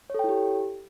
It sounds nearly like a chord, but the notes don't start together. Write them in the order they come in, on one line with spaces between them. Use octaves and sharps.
C#5 A4 G5 E4 G4